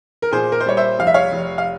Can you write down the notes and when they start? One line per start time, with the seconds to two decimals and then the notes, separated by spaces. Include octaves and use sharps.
0.22 A#4
0.31 A#2 G#4 C5
0.52 A#4
0.60 C5
0.66 G3 C#5
0.77 C5 E5
0.99 F1 F5
1.07 E5
1.14 C#5 F5
1.32 F1
1.58 F5